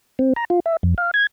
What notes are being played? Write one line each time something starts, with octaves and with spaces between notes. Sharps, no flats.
C4
A#5
F4
E5
F2
F5
G#6